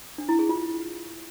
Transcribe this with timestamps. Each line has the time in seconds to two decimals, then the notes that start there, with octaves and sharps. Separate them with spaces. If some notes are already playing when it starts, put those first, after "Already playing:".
0.18 D4
0.29 E4
0.39 G#4
0.49 F4